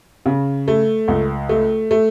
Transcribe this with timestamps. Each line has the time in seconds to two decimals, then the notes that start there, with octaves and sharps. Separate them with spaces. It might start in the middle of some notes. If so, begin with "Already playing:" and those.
0.26 C#3
0.68 A3
1.08 C#2
1.49 A3
1.91 A3